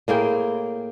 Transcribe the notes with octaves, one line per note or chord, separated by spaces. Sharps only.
A2 A#3 G#4 G5